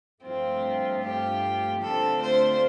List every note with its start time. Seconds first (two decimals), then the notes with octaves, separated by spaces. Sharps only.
0.23 G2 F3 A3 C4 F4
1.03 G4
1.82 D3 A3 C4 F4 A4
2.22 C5